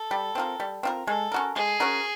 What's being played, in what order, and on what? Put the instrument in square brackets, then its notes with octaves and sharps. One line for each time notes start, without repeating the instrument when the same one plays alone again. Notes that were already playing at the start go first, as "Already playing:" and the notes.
Already playing: [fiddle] A4
[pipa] G3
C4 F4 A#4
G3
C4 F4 A#4
[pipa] G#3 [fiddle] A4
[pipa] C#4 F#4 A#4
[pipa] G#3 [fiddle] G#4
[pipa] C#4 F#4 A#4